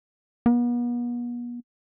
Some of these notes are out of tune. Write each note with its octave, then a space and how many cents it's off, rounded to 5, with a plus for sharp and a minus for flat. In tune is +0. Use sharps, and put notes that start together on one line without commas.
B3 -40